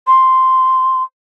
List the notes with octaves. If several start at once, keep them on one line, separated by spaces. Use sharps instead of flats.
C6